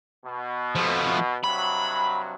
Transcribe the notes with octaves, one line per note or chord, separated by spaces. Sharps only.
B2
F3 A3
G2 C3 F#3 B5